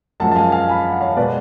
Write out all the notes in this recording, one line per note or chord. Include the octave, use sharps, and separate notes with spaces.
F#2 F3 G#3 F#5 A5
A5
F5 G#5
F5 G#5
G#5 B5
F#5
C#5 F5
B2 G#3 B4 D5